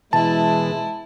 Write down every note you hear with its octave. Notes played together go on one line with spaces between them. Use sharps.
B2 E3 G#3 E4 A5